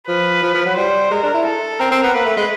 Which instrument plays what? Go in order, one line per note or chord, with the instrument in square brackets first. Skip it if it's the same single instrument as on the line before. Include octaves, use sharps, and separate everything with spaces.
[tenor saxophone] F3 [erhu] B4
[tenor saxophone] F3
F3
F#3
[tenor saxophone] G3 [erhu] C5
[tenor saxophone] G#3 [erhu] A#4
[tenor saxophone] D4
E4
[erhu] A4
[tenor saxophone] C4 [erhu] A#4
[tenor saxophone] C4
B3
[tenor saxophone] A#3 [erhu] B4
[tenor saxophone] A3
G#3